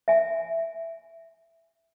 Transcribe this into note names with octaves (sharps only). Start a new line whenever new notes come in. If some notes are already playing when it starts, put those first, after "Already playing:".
E5 G#5